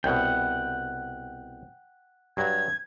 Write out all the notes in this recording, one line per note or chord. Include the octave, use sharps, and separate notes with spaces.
C2 B2 F#5 G5
G2 F#3 G#6